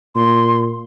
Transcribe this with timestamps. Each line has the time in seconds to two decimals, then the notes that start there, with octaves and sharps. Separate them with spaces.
0.16 A#2 C6